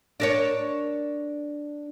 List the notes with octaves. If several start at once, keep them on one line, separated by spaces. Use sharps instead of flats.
D4 A#4 C#5